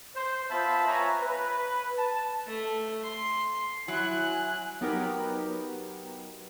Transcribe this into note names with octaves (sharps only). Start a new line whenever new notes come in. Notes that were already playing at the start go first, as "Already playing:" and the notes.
C5
B3 F4 C5 E5 A5 B5
B4 C#5 E5 G#5 A#5
B4
A5
A3
C6
F#3 E4 G#5 F#6
F#3 B3 D#4 G4 A#4